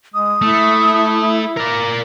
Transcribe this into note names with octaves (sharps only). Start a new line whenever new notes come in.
G#3 D#6
A3 E4
A#4 D5